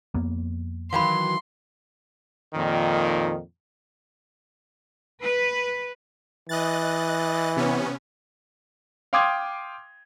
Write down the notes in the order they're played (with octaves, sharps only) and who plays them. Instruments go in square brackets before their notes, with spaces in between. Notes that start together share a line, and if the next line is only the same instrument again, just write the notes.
[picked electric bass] F2 A#3 B3
[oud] D#3 E3 F#3 [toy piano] F5 G5 B5 [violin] C6
[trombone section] F2 A#2 D#3
[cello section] B4
[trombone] E3 [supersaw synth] D#5 F#6 A6
[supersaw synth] C3 B3 C#4
[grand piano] F5 G5 C6 D6 D#6 G#6